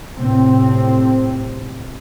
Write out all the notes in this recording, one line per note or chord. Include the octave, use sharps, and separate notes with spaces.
A2 C3 C4